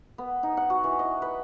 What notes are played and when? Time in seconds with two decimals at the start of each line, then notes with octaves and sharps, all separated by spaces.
0.18 B3
0.43 D#4
0.57 F#5
0.70 F#4
0.84 E3
0.99 D#5
1.22 B4